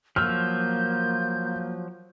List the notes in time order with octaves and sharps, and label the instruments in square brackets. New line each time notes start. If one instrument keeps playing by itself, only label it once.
[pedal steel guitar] F3 F#3 E6 [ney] A#3 [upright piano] F6 [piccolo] G6